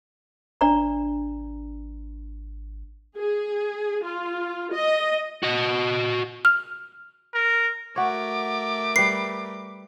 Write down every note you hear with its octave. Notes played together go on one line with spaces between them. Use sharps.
G#1 D4 D5 A#5
G#4
F4
D#5
F#4 D#5
F6
A#4
A3 F#4 A#4 C#5 D6
G3 B4 C7